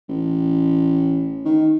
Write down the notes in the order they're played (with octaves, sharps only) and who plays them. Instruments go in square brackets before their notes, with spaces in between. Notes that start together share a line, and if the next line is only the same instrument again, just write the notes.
[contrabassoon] A1
D#3